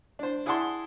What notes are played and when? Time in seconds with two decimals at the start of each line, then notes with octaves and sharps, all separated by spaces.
0.19 D4 C5
0.46 E4 G#4 D5 F#5 A5 C6